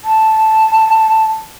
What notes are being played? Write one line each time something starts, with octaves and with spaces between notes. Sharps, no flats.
A5